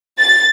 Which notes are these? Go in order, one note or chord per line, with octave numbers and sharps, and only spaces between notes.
A6